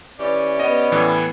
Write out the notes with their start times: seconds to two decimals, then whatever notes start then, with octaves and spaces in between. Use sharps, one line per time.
0.19 E3 C#4 G4 D5
0.60 B3 D#5
0.92 A2 E3